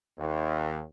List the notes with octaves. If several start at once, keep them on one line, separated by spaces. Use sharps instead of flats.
D#2